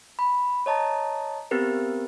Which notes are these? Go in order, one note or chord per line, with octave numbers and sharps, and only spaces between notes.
B5
C#5 D#5 A5 A#5
B3 C4 G4 A#4 B4